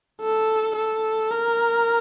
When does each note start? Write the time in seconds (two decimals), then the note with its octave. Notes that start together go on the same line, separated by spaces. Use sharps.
0.21 A4
0.76 A4
1.32 A#4